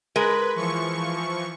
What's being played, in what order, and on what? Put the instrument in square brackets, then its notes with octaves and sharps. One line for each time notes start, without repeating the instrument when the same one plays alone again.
[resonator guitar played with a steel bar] G#3 A#4 [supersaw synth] B4
[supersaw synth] E3 F3 C#6